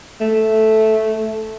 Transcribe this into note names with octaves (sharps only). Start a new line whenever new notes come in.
A3